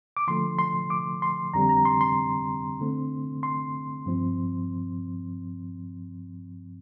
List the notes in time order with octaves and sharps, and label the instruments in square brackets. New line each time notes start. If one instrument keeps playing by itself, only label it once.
[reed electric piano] D6
D3 F3 A3 C6
C6
D6
C6
F2 D3 G3 C4 A#5
A#5
C6
C6
D3 A3 C4
C6
G2 F3 C4